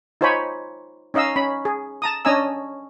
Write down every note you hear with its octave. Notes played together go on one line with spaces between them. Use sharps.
D#4 F4 C5 C#5 G#5 B5
C#4 D#4 D#5 F5 E6
C#4 B5
G#4
A5 A#5 D#6
C#4 D4 D#5 G#5 A#5 E6